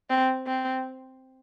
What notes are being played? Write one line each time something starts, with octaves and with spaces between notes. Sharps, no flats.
C4
C4